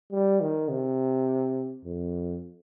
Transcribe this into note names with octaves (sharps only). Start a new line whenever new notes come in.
G3
D#3
C3
F2